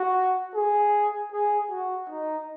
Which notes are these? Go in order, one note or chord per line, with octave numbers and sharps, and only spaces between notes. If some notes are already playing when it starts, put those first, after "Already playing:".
Already playing: F#4
G#4
G#4
F#4
D#4